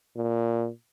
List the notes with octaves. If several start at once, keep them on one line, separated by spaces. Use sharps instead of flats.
A#2